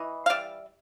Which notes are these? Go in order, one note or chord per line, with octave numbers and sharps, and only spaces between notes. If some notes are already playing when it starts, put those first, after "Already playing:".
Already playing: E3 D#5
F5
G3 D5 E5